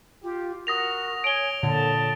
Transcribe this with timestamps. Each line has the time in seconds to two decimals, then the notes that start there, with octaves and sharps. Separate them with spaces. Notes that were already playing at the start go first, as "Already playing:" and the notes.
0.23 F4 G4
0.67 F#4 A#4 D#6 A#6 F7
1.24 C#5 G#5 D7 G7
1.63 A#2 D3 A5